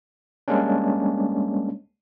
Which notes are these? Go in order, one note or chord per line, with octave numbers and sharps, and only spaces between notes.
G3 G#3 A#3 C#4 D4